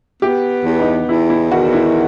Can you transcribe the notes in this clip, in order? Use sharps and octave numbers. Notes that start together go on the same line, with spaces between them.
B3 G4
E2
D#4
E2 E4
E4
D#3 F#4
E4